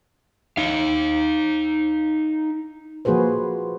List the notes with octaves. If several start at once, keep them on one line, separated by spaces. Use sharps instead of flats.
D#4 F5
F3 A#3 F#4 G#4 B4 C5